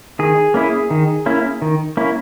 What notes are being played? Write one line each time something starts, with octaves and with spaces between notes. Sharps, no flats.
D#3 G#4
A#3 C#4 E4
D#3
A#3 C#4 E4
D#3
A#3 C#4 E4